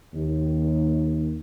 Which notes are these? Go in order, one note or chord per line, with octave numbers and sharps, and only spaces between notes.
D#2